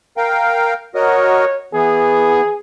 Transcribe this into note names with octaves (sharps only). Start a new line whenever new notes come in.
A#4 F5 G5
F#4 A#4 C#5 D#5
E3 B3 G#4